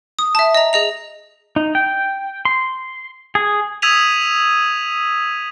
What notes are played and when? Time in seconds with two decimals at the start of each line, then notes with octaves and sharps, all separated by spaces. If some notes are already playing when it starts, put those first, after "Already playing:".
0.19 D#6
0.35 E5 A5
0.55 D#5 A#5
0.73 G#4 D#5 F7
1.56 D#4
1.75 G5
2.45 C6
3.35 G#4
3.82 D#6 E6 G#6 B6 D#7 F7